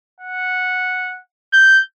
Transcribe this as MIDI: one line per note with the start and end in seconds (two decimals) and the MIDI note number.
0.21 1.20 78
1.53 1.80 91